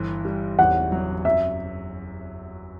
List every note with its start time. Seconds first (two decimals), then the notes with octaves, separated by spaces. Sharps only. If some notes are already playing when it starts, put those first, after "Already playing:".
Already playing: G1 E3
0.25 G3
0.59 E2 F#5
0.92 F#3
1.25 F#2 E5